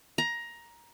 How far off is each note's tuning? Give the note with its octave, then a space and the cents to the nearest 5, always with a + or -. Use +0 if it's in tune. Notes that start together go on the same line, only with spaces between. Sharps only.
A#5 +15